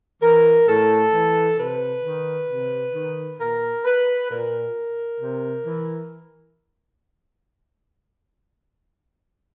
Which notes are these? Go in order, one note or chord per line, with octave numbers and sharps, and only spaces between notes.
E3 A#4
A2 A4
E3
C3 B4
D#3
C3
D#3
A#2 A#4
B4
A#2 A#4
C3
E3